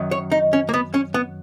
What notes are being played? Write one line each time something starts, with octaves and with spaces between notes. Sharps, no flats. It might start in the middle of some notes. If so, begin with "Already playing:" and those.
Already playing: F#2 D#3 F#3
C#5
D#4
C#4
A#3
B3
C#4
B3